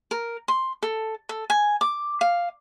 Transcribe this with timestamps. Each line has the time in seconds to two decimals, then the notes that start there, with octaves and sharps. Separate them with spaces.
0.11 A#4
0.48 C6
0.83 A4
1.29 A4
1.50 G#5
1.81 D6
2.21 F5